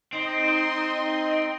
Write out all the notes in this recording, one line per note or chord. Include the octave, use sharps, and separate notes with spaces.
C4 D#4 D#5 C6